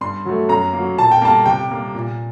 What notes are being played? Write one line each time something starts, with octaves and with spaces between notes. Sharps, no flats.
G2 C6
F#3 A3
F#2 A#5
A#3
F#3
A#2 A5
G5
G3 A#3 A5
C3 G5
G3 A#3
A#2